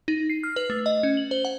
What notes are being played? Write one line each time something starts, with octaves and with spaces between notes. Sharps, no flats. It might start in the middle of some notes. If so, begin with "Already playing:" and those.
D#4
C7
F6
B4
A3
D#5
C#4
F#7
C5
F#5